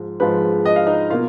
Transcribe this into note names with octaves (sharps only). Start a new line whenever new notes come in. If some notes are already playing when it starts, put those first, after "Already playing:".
Already playing: G#2 F3
G#2 F3 G#3 B4
D#5
F5
D#4 D#5
B2 A#3 F4 F5